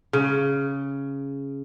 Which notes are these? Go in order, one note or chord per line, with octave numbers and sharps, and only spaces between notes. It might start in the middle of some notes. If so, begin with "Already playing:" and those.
C#3